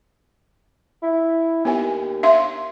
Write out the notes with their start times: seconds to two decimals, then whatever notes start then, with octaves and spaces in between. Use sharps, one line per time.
1.03 E4
1.65 D#2 B3 G#5
2.23 E5 F5 C6